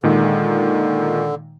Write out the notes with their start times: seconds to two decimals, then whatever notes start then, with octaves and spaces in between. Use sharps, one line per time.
0.03 A#2 D3 D#3 G#3